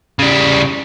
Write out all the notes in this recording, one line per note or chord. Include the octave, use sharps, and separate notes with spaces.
C#3 G3